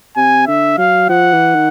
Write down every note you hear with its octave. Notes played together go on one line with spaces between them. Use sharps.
C3 G#5
D3 E5
F#3 F5
F3 F#5
E3
D#3